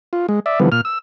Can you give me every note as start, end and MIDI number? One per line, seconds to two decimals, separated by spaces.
0.13 0.26 65
0.29 0.40 56
0.46 0.59 74
0.46 0.59 76
0.60 0.69 50
0.60 0.69 52
0.60 0.69 53
0.60 0.69 55
0.60 0.69 59
0.72 0.81 46
0.72 0.81 89
0.85 0.98 88